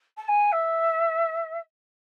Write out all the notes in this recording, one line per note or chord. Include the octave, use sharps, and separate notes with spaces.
A5
G#5
E5